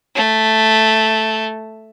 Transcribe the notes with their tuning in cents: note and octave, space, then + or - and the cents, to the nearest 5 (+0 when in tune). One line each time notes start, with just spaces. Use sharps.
A3 +0